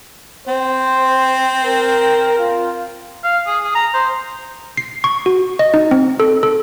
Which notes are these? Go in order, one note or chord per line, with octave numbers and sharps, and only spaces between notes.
C4 C5
A#4
F4
F5
G#4
G#4
A#5
C5
C7
C#6
F#4
D#5
D#4
C4
A4
A4